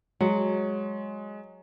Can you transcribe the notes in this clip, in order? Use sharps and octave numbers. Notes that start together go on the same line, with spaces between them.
F#3 G#3